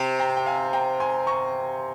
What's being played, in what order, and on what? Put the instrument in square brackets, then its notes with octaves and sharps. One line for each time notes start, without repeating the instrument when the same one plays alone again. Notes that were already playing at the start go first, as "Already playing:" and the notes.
Already playing: [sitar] C3 [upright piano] G5
[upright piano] G5 A#5
G5
F5 G#5
G5 A#5
G#5 C6
A#5 C#6